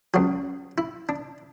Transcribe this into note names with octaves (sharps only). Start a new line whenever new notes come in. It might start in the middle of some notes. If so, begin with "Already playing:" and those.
C#2 C#3 F#3 F#4
E4
D4